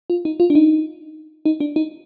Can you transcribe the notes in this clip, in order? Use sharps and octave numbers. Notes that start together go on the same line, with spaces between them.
F4
D#4
F4
D4
D#4
D#4
D4
D#4